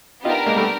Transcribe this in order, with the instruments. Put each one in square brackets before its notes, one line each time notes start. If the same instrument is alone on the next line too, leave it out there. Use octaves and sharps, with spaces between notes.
[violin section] B3 D4 G4 A#4 [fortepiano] D#4 F4
[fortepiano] G#3 A#3
G3 A3